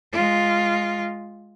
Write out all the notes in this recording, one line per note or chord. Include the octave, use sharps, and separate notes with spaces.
G#3 F4